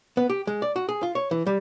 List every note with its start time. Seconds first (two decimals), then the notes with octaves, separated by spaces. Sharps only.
0.17 B3
0.30 G4
0.47 G#3
0.62 D5
0.76 F#4
0.89 G#4
1.03 F4
1.15 C#5
1.31 E3
1.47 G3